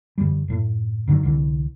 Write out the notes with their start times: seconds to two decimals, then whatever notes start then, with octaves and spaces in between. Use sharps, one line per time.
0.18 F#2 D3 E3 G3
0.48 F#2 A2
1.08 F#2 D3 D#3 F#3
1.23 C2 D3 E3